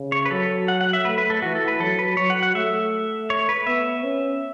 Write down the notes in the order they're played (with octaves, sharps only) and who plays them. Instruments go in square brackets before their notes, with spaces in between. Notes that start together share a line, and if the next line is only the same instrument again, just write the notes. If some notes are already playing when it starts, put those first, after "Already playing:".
Already playing: [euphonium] C#3
[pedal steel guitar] C#5
B4
[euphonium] F#3 [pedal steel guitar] A4
[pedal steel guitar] F#5
F#5
E5
[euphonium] A3 [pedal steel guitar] B4
[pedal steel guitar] B4
A4
[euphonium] E3 [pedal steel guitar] F#4
[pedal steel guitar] A4
B4
[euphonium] F#3 [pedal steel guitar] A4
[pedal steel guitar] B4
[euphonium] F#3 [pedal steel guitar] C#5
[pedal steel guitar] F#5
F#5
[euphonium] A3 [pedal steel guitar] E5
[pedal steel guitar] C#5
B4
[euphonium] B3 [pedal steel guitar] E5
[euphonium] C#4